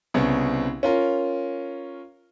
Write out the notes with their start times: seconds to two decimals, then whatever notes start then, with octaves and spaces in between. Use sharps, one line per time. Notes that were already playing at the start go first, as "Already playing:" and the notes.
0.14 C2 C#3 B3
0.83 C#4 F4 A#4